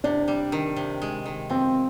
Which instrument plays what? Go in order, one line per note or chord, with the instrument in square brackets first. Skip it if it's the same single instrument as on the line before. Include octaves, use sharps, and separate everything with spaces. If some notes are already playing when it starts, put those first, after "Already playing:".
[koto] C3 [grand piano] D4
[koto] G3
D#3
C3
G#3
D#3
[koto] F3 [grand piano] C4